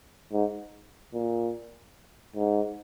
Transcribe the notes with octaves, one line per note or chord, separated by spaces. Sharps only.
G#2
A#2
G#2